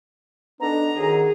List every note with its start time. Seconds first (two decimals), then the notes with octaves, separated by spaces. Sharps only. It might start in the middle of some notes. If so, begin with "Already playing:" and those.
0.61 B3 D4 D#4 A4 A#5
0.97 B1 F#2 D#3 F#3 G#4